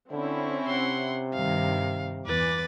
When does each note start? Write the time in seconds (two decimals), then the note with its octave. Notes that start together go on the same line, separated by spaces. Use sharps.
0.11 D3 C4 C#4 E4
0.67 C3 F#5 C6
1.34 G2 D#3 F5
2.26 E2 B4 D6 A6